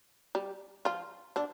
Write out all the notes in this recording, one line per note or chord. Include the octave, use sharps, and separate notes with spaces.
G3 G4
F3 F4
D3 D4